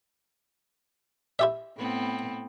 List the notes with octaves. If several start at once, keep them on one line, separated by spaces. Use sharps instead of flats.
E4 G4 E5
A2 B3 C4